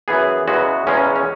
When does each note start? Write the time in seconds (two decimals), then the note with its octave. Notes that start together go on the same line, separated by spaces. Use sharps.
0.08 F#2 E3 B3 G#4
0.48 E2 C#3 E3 G#3 B3 F#4
0.87 E2 C#3 G#3 C#4
0.97 C#4
1.16 C#4